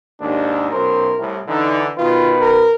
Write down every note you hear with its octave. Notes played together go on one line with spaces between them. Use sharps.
D#2 G#2 D4
B1 F#2 A#4 C5
C2 A2
D3 E3 D#4
B2 D#3 F4 B4
A#4